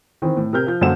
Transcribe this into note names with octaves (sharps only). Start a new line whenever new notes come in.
D#3 E3 C4
A2
C3 A#4 F6 G6
F3 G6
F#2 D3 A#3 C5 F#5 E7